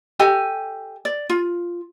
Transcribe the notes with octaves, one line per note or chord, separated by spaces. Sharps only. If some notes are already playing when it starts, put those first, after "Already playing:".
G4 A4 D#5 G#5
D5
F4